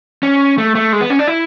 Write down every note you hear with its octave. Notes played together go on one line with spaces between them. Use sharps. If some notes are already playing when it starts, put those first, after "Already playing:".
C#4
A3
A3
G#3
B3
C#4
D4
E4